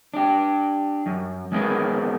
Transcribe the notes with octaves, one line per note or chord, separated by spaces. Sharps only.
D4 G4
F#2
G#3 B3 C#4 G#4 A#4 B4